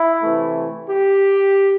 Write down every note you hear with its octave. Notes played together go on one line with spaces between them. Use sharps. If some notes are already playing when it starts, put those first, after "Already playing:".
Already playing: E4
C3 E3 A3
G4